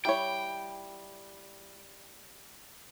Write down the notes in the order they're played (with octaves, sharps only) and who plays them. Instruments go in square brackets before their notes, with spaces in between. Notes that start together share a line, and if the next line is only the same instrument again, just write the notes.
[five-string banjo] G3 E4 C#5 [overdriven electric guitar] G5